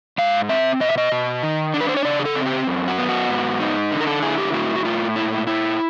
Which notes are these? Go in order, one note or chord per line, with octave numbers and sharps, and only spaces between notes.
G#2 F5
C4 E5
B2 D#5
E5
D#5
B2
D#3
D4
B4
C5
C#5
C#3 D5
G#4
A4
C4
G4
F#2
F#4
B3
F#4
G#2
D#4
D3
A#4
A4
E4 G#4
G4
A2 F#4
F#4
A2 F4
A#2 E4
E4